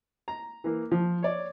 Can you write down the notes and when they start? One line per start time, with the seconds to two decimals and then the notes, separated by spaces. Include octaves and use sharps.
0.28 A#5
0.64 E3 A#3
0.92 F3
1.23 C#5 D5